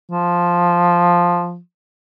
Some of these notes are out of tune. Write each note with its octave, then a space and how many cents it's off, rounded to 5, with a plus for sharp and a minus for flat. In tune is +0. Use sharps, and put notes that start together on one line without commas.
F3 +0